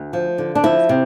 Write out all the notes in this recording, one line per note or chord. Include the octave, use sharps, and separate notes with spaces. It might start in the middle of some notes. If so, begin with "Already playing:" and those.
Already playing: D2
F3
D3
D4
F3 E4
C3